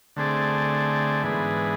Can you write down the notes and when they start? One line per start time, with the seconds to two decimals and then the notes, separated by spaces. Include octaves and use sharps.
0.16 D3 A3 C4 G#4 D5
1.23 G#2 E3 B3 D4 G#4